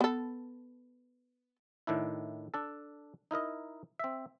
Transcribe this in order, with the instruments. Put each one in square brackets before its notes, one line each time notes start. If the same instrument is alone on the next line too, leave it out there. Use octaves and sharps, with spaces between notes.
[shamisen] B3 A4
[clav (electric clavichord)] A2 D#3 D4 E4
D4 A4
D#4 E4 A#4 D#5
C4 E5